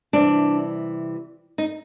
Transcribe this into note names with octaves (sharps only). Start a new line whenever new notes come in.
C3 E3 G3 D4
D#4